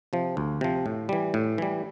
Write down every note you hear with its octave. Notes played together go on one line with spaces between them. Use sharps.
C3 F3
D2
C3 F3
A2
E3 G3
A2
E3 G3